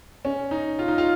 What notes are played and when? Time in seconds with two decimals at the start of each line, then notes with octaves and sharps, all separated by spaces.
0.25 C#4
0.51 D#4
0.79 F4
0.88 D#4
0.98 F4